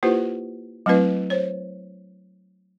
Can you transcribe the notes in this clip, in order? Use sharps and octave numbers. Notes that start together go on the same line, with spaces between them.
A#3 E4 F4 G4 B4 C5
F#3 A3 C4 E4 B4 D#5
C5 C#5